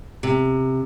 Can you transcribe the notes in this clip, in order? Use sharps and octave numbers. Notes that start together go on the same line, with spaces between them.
C3